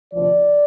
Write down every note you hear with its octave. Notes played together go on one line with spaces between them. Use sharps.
D2 C3 F3 D5